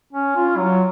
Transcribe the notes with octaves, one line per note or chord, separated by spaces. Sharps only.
C#4
F4
F#3